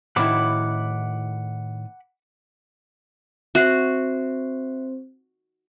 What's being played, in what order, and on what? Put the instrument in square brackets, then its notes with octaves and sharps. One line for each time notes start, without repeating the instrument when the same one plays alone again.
[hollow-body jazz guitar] A2 D#3 E4 [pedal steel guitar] F#5 B5 D6
[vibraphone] C4 C5 [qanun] F#4 [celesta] E5 F#6 C7